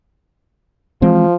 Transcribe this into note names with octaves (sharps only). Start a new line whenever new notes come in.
E3 F3 G#3 C4